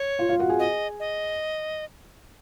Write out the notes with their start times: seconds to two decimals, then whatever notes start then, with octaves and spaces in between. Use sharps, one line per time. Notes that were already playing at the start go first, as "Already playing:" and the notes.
Already playing: C#5
0.19 F4 F5
0.29 F4 F5
0.39 F#4 F#5
0.49 G#4 G#5
0.59 D#5
1.00 D#5